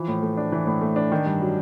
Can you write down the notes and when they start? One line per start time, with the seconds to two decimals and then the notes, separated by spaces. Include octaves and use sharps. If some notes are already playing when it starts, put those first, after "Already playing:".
Already playing: E3 F3
0.08 A2
0.22 A3
0.37 D4
0.52 E3
0.67 A2
0.81 A3
0.96 D4
1.12 D#3
1.26 G2
1.41 F#3